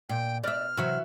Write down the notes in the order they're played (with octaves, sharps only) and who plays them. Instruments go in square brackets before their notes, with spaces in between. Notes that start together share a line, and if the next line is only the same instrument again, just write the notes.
[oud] A#2 [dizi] G5
[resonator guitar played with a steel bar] B2 [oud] D5 E5 [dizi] F6
[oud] C3 F#3 [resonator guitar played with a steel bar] E3 F#4 E5